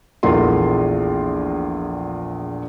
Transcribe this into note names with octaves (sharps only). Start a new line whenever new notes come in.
A#1 E2 A3 F4 A#4 C6